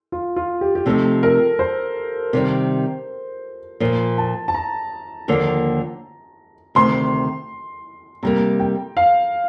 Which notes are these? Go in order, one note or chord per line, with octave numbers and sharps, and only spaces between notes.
F4
F4
G4
G4
C3 F3 A3 D#4 A4
A#4
C5
C3 D#3 G3
A#2 F3 A#3
A5
A5
A#5
D#2 D3 F3 A#3
D2 C3 D#3 C6
C3 G3 A#3 A#5
G5
F5